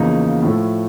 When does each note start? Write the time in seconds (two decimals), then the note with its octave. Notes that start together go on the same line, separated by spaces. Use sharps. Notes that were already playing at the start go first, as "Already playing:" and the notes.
Already playing: E2 C#3 F3 A#3 D#4
0.43 A2 F3 A3